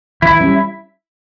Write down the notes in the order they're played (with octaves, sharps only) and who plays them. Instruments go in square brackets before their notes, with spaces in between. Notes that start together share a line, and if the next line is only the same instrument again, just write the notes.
[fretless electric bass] E3 [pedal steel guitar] E4
[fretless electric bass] G3 C#4